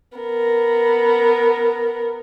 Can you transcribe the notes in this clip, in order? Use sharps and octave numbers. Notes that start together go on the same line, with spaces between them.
B3 A#4